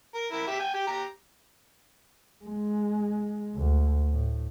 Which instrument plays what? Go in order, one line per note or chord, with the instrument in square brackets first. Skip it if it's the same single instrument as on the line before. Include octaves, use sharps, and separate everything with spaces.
[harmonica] A#4
E4 A#4
G4 E5
G5 G#5
G4 G5
G4 A#5
[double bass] G#3
D2
A2